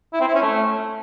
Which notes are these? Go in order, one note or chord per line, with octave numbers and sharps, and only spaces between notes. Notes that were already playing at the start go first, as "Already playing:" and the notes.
E4
C4
E4
C#4
A3